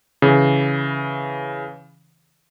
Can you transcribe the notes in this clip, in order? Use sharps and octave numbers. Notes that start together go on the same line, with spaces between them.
C#3 E3